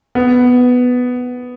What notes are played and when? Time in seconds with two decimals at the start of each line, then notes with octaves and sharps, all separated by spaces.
0.15 B3